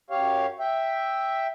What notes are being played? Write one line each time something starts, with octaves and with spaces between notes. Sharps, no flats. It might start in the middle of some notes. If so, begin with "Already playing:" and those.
F#2 G4 C#5 F5
E5 G5